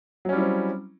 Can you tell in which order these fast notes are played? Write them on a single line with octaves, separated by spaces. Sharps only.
F#3 C#4 G3 E4 C4